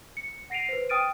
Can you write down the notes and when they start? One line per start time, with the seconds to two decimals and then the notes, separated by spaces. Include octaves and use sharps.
0.17 C#7
0.50 F#5 A#6 C7 D7 D#7 F7
0.69 B4 C5
0.89 G5 D#6 F6 A6 D7 D#7